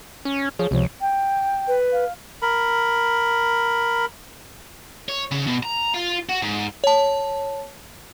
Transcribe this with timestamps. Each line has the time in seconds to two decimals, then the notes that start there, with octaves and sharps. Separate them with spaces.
0.25 C#4
0.59 F3 G#4 C#5
0.71 C#2 C3 F3 C#5
1.01 G5
1.68 B4
1.92 F5
2.42 A#4 B5
5.09 C#5
5.31 C#3
5.47 B2
5.63 A#5
5.94 F4
6.29 F#4
6.42 G#2
6.84 C#5 A5